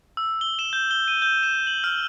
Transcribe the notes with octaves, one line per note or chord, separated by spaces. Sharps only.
E6
G7
E7
G6
G7
D#7
G6
E7
F#7
F6